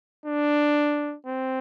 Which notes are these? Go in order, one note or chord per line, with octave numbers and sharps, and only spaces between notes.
D4
C4